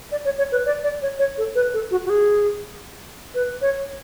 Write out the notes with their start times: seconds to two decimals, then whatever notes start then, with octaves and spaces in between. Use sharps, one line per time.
0.12 D5
0.25 C#5
0.38 C#5
0.52 B4
0.66 D5
0.84 D5
1.02 C#5
1.19 C#5
1.38 A4
1.55 B4
1.74 A4
1.91 F#4
2.05 F#4
2.10 G#4
3.35 B4
3.62 C#5